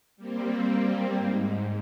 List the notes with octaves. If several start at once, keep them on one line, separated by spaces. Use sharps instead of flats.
G3 A#3 C4
G#2